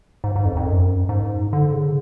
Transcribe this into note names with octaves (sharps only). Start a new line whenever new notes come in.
G#2
G#2
F2
F2
F#2
G#2
D3
C#3